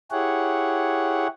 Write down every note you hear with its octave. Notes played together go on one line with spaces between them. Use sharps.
E4 G4 G#4 C#5 F#5